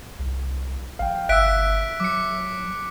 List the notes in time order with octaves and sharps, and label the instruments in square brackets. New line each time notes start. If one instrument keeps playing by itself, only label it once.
[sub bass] C2
[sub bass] A#1 [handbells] F5 G5
[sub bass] G1 [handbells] E5 E6 [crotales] F#6 B6 D7
[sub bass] F#3 [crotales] D6 C#7